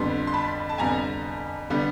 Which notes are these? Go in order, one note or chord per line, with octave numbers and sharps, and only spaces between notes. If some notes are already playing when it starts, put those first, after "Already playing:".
Already playing: F2 D3 G3 B3 C6
C6
A5 B5
A5
F2 D3 G3 B3 G#5 A#5
D3 G3 B3